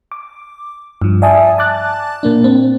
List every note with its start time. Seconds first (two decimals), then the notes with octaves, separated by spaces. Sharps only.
0.12 D6
1.02 G2 F3
1.22 D5 E5 G#5 A5 D#6
1.58 A5 D6 F#6 A6
2.23 A#2 A#3 D4
2.44 C4